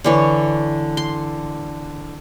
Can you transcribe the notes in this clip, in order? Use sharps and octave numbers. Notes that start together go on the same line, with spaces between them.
D3 E3 C#5
C6